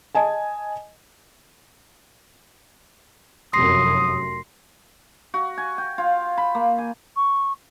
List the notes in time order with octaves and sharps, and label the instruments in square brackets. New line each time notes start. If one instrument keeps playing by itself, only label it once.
[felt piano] D#5 G#5 A5
[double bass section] F1 F#2 [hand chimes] C6 A#6 C7 [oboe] D#6
[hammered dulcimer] F#4
G#5
G5
F4
B5
A#3
G#5
[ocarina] C#6